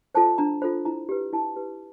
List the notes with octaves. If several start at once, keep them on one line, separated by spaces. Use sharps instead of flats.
F4 A4 C5 A5
D4 A#5
F4 A4 C5 B5
E4 A#5
G4 B4
E4 A5
G4 B4